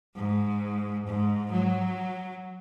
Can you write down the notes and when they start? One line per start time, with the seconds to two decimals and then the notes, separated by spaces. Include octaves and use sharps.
0.16 G#2
1.07 G#2
1.52 F#3